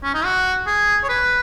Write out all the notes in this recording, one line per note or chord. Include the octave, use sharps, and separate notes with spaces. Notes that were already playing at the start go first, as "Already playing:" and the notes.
C#4
D#4
F#4
G#4
C#5
B4